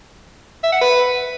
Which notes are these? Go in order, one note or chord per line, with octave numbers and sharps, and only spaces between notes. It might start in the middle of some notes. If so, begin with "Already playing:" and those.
E5
F#5
B4